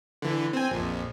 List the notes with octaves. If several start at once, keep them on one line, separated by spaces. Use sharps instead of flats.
D3 E3
C4 G#5
A#1 F2